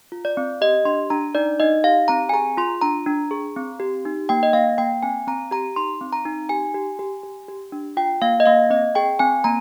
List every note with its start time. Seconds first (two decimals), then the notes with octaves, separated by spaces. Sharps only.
0.12 F4
0.25 D5
0.37 C4
0.61 G4 D#5
0.85 D4 C6
1.10 D4 A#5
1.35 D#4 D5
1.60 D#4 D#5
1.84 G4 F5
2.08 C4 A#5
2.29 G#5
2.33 G#4 A#5
2.57 F4 C6
2.82 D4 A#5
3.06 D4
3.31 G#4
3.56 C4
3.80 G4
4.05 D#4
4.29 A#3 G5
4.43 D#5
4.53 A#3 F5
4.78 A#3 G5
5.03 C4 G#5
5.27 C4 A#5
5.51 G4 A#5
5.76 D#4 C6
6.01 C4
6.13 A#5
6.25 D#4
6.49 G4 G#5
6.74 G4
6.99 G4
7.23 G4
7.48 G4
7.72 D4
7.97 F4 G5
8.22 A#3 F5
8.40 D#5
8.45 A#3 F5
8.70 C4 D#5
8.95 G#4 G5
9.19 C4 G#5
9.44 A#3 A#5